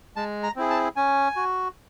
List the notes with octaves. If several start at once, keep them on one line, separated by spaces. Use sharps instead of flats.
G#3 A5
A#5
C4 E4 G#4
A5
C#4 G#5
F#4